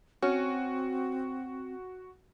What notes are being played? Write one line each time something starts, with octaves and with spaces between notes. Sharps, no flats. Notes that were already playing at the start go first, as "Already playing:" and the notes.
C4 C#4 F#4